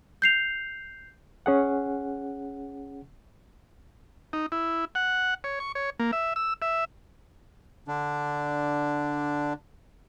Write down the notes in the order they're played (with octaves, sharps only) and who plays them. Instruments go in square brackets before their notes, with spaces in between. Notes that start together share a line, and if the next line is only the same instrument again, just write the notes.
[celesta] G6 C7 F7
[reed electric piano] C#4 G#4 F#5
[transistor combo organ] D#4
E4
F#5
C#5
C#6
C#5
A#3
E5
E6
E5
[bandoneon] D3 D4